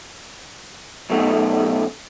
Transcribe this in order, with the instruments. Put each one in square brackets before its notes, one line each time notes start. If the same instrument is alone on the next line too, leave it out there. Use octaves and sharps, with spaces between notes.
[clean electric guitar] F#2 B2 A3 D#4